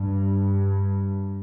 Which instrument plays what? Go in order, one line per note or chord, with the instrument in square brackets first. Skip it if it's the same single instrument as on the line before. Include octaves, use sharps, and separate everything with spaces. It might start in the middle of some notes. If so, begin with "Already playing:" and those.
Already playing: [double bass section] G2